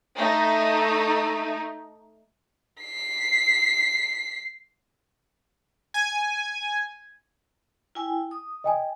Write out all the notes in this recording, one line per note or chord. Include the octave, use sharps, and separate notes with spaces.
A3 D#4
B6 C7
G#5
E4 G5 G#5
D#6
D#5 G5 G#5